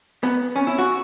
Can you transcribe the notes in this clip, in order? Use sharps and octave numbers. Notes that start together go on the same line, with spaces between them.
B3
C#4
E4
F#4